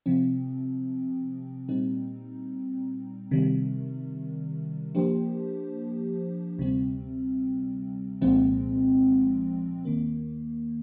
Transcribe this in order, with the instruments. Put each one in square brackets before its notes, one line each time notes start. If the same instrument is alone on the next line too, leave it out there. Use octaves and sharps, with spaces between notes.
[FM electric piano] C3 F3 C4
A#2 G3 C4 D#4
C3 D#3 G3
F3 A#3 D4 G4 C5
D2 C3 G3 C4
C2 A#2 F3 G#3 C4
D#2 D#3 A#3